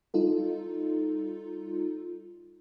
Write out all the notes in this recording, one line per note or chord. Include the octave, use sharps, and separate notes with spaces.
G3 D#4 F4 A4